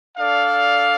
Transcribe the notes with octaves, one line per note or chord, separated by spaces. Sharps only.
D4 A4 D5 F5